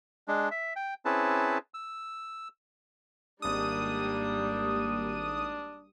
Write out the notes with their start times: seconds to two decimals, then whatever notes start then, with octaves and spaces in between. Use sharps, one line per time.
0.28 G#3 D4
0.51 E5
0.76 G5
1.05 C4 C#4 E4 G#4 B4 A5
1.74 E6
3.42 G#1 G3 A#3 D4 D#6